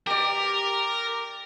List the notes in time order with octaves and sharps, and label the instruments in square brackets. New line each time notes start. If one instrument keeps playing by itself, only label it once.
[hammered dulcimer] G4 D5 [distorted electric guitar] A#4